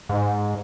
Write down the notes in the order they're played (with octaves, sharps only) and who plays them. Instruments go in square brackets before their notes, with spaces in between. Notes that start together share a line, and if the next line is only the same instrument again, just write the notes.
[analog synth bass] G#2